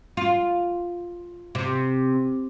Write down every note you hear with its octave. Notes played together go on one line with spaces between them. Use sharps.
F4
C3